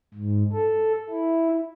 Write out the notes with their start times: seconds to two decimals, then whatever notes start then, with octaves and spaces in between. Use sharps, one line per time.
0.14 G#2
0.53 A4
1.10 E4